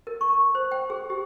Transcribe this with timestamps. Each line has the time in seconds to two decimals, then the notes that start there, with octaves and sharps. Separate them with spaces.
0.07 A#4
0.21 C#6
0.55 C5
0.72 G5
0.90 G#4
1.10 G4